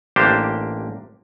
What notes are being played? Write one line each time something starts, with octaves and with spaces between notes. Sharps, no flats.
A1 A#3 D4 G4 C5